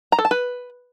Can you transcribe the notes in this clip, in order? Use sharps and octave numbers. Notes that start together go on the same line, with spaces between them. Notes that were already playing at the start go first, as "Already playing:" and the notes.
A#5
A4
A5
B4